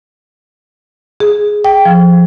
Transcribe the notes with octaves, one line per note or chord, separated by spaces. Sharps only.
G#4
G5
F3